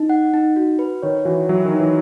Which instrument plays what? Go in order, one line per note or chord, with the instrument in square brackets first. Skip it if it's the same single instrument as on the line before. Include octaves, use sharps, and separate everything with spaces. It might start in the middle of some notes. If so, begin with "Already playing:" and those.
Already playing: [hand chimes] D#4
F#5
D#4
F#4
B4
[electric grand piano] D#3 [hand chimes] C#5
[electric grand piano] E3 [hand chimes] F#4
[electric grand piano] F#3 [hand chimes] E5
[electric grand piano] D#3
[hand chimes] D#4
[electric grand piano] E3